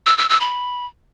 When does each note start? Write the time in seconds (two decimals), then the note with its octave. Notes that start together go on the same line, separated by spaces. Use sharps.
0.06 E6
0.18 E6
0.29 E6
0.41 B5